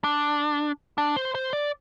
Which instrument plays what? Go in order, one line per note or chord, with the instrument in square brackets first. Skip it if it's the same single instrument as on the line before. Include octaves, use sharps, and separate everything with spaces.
[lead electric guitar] D4
D4
C5
C5
D5